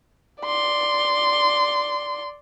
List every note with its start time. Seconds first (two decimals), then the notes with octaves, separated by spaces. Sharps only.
0.42 D5 C6